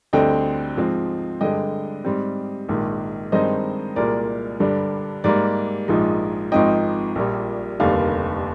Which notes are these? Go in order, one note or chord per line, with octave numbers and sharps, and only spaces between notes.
D2 D3 G3 C4 D#5 G5
G#2 F3 G#3 C4
G2 D3 G#3 D#5 G5
G#2 G3 C4
A#1 G#2 D#3
G2 D#3 G#3 C4 D#4 C5 D#5
C2 A#2 G#3 A#4 D5
G2 D3 G3 D4
G#2 G3 A#3 A#4 D5
A#1 G#2 F3 G#3 D#4
G#1 G#2 F3 C4 D#4 D#5 G5
A#1 A#2 G3
F1 D#2 D3 G3 A#3 D5 F5